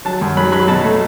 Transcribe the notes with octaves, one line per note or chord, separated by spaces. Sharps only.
F#3 A5
F#2
F#3 B5
F#3 B5
B2 A5
A3